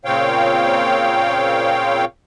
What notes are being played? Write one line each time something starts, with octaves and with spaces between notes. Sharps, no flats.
A#2 C#3 C4 C#5 F5 G5